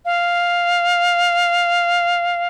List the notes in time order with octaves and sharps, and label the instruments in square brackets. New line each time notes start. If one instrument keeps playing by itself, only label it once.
[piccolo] F5